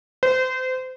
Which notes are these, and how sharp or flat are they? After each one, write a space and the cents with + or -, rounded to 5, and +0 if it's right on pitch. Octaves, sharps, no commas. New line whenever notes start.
C5 -30